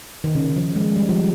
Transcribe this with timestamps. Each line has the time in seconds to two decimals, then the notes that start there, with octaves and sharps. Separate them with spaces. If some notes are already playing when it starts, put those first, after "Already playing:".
0.24 D#3
0.35 C#3
0.56 F3
0.75 G#3
0.96 G3
1.09 F3